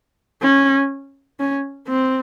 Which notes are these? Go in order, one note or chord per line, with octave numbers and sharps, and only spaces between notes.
C#4
C#4
C4